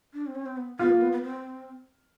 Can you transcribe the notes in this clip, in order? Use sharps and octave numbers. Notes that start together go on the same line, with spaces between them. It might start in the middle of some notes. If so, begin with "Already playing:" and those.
D4
C4
C#4
C4
B3
B3 F4
A#3
B3
B3
C4